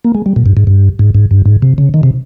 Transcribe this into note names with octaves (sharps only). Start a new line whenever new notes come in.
A#3
G#3
G3
A#2
G2
G#2
G2
G#2
G#2
G2
G#2
C3
C#3
D#3
C3